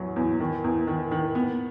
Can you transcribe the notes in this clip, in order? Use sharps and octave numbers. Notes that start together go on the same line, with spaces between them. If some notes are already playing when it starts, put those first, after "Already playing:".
Already playing: E2 F#3
E2
D#3
E2
D#3
D#3
B3